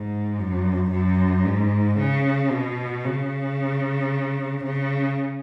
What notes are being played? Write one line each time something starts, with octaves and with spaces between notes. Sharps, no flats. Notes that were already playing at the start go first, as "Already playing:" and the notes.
Already playing: G#2
F#2
F#2
G#2
C#3
B2
C#3
C#3